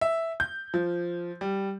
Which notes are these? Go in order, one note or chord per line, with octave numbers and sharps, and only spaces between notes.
E5
G6
F3
G3